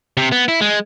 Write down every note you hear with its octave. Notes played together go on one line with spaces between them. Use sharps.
C3
B3
E4
G#3